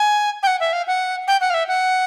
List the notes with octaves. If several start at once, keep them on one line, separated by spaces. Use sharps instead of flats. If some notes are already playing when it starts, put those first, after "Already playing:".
Already playing: G#5
G5
F#5
E5
F5
F#5
G5
F#5
F5
E5
F#5